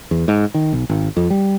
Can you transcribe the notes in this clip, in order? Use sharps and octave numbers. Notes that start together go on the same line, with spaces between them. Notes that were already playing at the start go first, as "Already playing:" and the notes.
E2
G#2
D#3
B1
G#1
F2
G3